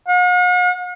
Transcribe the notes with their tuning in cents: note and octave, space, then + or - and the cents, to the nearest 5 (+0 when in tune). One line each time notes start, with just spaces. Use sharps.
F#5 -45